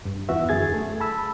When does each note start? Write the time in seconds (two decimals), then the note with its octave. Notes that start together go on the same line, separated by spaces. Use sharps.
0.05 G2
0.29 E2 E3 B3 F#4 E5
0.49 F#2 D3 G#4 G#6 A6
0.74 A3
1.00 A5 B5 E6